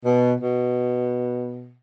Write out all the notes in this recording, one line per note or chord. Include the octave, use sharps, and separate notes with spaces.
B2
B2